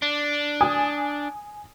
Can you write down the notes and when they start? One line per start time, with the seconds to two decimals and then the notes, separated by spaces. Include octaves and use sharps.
0.02 D4
0.61 G#5 D#6